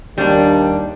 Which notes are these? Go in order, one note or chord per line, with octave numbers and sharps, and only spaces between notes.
D#2 G3 D4